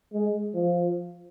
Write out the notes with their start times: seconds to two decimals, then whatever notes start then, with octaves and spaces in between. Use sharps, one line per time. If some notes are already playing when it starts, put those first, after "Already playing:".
0.13 G#3
0.55 F3